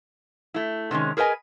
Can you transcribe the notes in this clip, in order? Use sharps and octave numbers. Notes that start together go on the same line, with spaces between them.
A3 E4
C3 D#3 G#3 C#4
G#4 A#4 B4 D#5 G#5